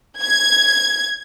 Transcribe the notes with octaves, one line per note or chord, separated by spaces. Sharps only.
G#6